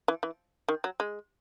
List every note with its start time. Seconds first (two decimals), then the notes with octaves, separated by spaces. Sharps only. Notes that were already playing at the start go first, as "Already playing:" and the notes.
0.08 E3
0.23 E3
0.68 D#3
0.84 F#3
1.00 G#3